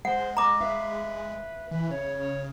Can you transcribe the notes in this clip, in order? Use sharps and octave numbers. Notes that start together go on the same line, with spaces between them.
G#3 C5 F#5
D#5 A#5 D6
B4 E5 F5
E3 B4
C#3 C#5